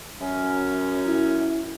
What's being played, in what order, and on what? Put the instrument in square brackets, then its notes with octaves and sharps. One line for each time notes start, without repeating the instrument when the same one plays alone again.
[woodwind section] F#2 C#4
[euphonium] E4